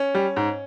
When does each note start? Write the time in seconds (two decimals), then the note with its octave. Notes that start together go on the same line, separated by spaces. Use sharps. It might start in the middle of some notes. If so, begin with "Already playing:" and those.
Already playing: C#4
0.15 G3
0.36 G#2